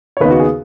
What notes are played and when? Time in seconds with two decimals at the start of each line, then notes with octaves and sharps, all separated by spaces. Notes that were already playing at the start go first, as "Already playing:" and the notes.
0.17 C#5
0.20 D#2 C#3 B3 D#4 B4
0.31 F#4
0.40 G#4